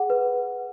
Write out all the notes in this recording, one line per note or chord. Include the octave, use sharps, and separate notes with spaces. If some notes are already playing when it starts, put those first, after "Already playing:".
Already playing: G#4 F#5
B4